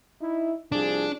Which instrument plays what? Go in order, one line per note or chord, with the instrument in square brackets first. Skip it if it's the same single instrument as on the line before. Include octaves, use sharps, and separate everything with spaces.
[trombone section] D#4 E4
[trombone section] C2 F3 G#4 [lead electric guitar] D4